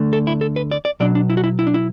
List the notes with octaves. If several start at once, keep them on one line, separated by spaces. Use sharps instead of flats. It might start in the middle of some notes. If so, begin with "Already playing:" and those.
Already playing: D2 D3 A3 D4
A4
E4
A4
B4
D5
D5
B2 F#3 D4 D5
D4
E4
F#4
E4
E4
D4
E4